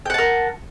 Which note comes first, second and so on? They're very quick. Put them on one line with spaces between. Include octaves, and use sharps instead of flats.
G5 F#5 A5 A#4